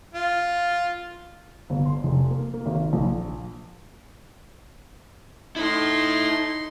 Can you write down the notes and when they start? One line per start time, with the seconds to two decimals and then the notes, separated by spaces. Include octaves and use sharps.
0.15 F4
1.70 G1
1.86 C6
2.04 F1
2.31 A#3
2.54 A#3
2.66 G#1
2.93 A#1
5.56 D#4 E4 A4 C6